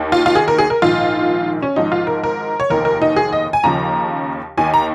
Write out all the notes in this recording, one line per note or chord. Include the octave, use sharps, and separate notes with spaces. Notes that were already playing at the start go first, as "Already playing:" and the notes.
Already playing: D#2 D#3
F4
F4
G#4
A#4
G#4
A#4
A#1 G#2 D#3 F4
C#4
G#1 G#2 F3 D#4
F4
A#4
A#4
C#5
F1 D#2 D#3 A#4
A#4
D#4
G#4
D#5
G#5
D#2 C#3 F3 A#5
D#2 D#3 G#5
A#5